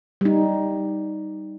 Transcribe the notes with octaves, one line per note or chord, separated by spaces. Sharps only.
G3 D#4